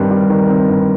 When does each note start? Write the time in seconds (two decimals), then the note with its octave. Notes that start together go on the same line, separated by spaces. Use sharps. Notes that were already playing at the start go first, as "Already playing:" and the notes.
Already playing: G2 D#3 G3 C4
0.11 G3
0.30 D#3
0.49 C4
0.69 G2